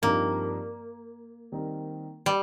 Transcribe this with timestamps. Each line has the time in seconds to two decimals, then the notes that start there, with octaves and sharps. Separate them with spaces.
0.02 G2 F3 A#3 C4 D#4 G4
1.52 D#3 G3 C4 D#4 A#4
2.26 G3